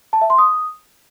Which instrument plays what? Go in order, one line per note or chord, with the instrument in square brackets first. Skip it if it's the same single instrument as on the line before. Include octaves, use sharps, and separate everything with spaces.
[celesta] A5
E5
C6
D#6